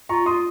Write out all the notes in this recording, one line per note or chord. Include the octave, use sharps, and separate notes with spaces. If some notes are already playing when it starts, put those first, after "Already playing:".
F4 A#5 C#6
C6 D#6